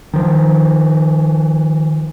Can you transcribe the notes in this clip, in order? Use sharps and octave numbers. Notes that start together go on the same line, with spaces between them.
D#3 F3